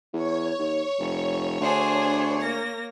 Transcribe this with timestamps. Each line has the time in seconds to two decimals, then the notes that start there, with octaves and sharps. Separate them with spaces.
0.13 E2 C#5
0.59 D#2
0.99 F1
1.61 D2 D4 G#4 C5
2.41 A#3 A#6